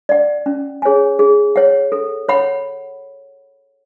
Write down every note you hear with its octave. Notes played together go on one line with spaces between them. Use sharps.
D5 F#5
C#4
G#4 C#5 G#5
G#4
C#5 F#5
A4
C#5 F#5 B5